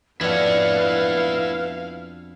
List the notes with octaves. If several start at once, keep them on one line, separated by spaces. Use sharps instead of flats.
F2 B3 D4 E4 F#4 B4 C#5 F5